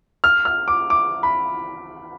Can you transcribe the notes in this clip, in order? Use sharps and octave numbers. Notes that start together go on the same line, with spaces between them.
F6
F6
D6
D6
B5